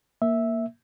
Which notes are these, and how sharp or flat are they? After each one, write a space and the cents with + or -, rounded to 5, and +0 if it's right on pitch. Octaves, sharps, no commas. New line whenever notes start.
A#3 +0 E5 -5